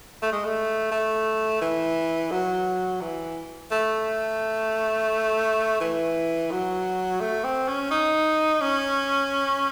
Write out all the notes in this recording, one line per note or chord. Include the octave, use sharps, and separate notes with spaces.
A3
G#3
A3
A3
E3
F#3
E3
A3
E3
F#3
A3
C4
C#4
D#4
C#4